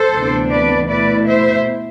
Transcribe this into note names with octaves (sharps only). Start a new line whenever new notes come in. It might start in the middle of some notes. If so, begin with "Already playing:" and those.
Already playing: A4 C5
D2 C3 E3 B3 D4
B4 D5
B2 A3 E4 B4 D5
C5 E5